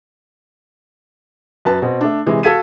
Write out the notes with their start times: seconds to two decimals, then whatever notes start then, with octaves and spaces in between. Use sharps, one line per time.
1.65 F#2 B4 A5
1.82 B2 C4
2.01 A3 D4
2.26 C3 E3 G#3
2.43 F#4 A4 F5 G#6 B6 D#7